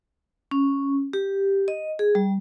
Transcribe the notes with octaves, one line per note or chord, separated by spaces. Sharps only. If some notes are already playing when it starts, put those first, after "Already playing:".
C#4
G4
D#5
G#4
G3